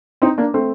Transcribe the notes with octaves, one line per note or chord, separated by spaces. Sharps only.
C4 D#4
A#3 D4
A3 C4